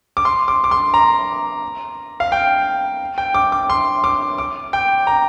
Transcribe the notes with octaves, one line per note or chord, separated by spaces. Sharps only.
D6
C6
D6
D6
C6
A#5
F5
G5
G5
D6
D6
C6
D6
D6
G5
A#5